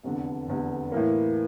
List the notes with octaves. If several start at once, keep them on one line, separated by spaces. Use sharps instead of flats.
F1 E2 D3
F1 E2 D3
A2 E3 A#3